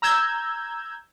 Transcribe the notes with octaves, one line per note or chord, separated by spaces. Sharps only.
A#5 E6 G6 G#6